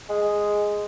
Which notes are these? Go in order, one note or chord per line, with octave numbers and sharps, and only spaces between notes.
G#3